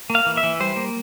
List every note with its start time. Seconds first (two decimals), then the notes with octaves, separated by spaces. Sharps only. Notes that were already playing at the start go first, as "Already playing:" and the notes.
0.10 A#3
0.15 F5
0.26 E3
0.37 E5
0.43 E3
0.60 G3 C5
0.76 A#3